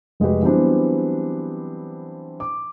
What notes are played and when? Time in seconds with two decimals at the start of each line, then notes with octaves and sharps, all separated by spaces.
0.20 F1 G#3 F#4 G4 B4
0.42 E3 F#3 G3 B3 C4 D4
2.40 D6